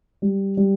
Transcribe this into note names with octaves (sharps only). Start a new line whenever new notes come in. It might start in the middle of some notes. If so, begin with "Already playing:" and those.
G3
G3